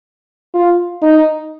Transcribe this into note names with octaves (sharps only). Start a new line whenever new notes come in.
F4
D#4